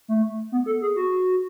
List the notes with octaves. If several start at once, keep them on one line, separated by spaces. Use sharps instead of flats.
A3
B3
A4
G#4
F#4